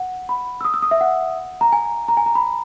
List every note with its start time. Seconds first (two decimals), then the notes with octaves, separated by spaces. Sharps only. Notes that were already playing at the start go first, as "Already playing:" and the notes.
Already playing: F#5
0.29 B5
0.61 E6
0.65 D#6
0.74 E6
0.82 D#6
0.91 E5
1.01 F#5
1.61 A#5
1.72 G#5
2.08 A#5
2.17 G#5
2.26 A#5
2.35 B5